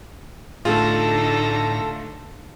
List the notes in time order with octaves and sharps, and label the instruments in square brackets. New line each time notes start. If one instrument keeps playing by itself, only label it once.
[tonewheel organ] A2 A#6 [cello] D3 D#4 [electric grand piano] A3 F4 [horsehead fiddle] A4